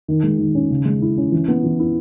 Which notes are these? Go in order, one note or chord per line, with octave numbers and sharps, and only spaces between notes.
D#3
G#3
D#3
C#4
C#3
G#3
E4
C#4
E3
B3
E3
E4